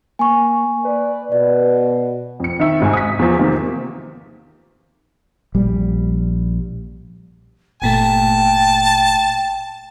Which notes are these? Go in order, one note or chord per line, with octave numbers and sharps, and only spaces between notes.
A#3 G#5 C#6
B4 D5
B2 D5
F2 C#7
D#3 E5
G#1 G#2 G#5
D#6 B6
E2 F3
C3 D#3 A#3 C4
A#1 G3
G1 A#2 A3 G5 A5